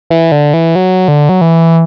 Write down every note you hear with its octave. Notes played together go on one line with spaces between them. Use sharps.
E3
D3
E3
F#3
D3
F#3
E3